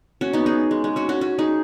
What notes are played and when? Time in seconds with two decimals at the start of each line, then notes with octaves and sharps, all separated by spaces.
0.21 C#4 F#4
0.33 B3 D#4
0.46 D#4 G#4
0.71 G#3
0.84 G#3
0.96 C#4 F#4
1.09 C#4 F#4
1.21 C#4 F#4
1.39 D#4 G#4